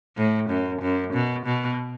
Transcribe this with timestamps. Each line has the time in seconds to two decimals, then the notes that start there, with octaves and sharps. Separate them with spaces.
0.17 A2
0.50 F#2
0.81 F#2
1.14 B2
1.46 B2